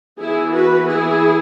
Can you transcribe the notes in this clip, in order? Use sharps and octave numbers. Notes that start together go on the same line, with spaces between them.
E3 B3 E4 G#4
F#4 B4
E4 G#4